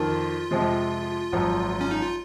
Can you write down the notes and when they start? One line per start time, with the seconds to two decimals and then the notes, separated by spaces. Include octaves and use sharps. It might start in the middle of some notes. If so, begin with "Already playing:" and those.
Already playing: F2 D#3 A#3 F4
0.51 F2 C3 F3 G#3
1.32 G#1 F#2 F3
1.81 C#4
1.91 D#4
2.03 F4